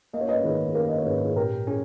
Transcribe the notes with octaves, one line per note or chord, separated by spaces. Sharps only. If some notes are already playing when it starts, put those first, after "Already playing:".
A#3 D#5
C#5
B4 D#5
D#3 G#4 B4
G#4
A#3 G4 A#4
D#5
C#5
G#2 G#4 B4
G#4
A#2 G4 A#4
C#4 G#4